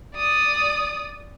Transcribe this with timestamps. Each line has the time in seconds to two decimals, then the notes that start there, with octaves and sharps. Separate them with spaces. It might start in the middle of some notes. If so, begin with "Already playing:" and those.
0.16 D5 D#6